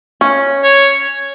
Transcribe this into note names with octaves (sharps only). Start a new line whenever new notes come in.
C#4
C#5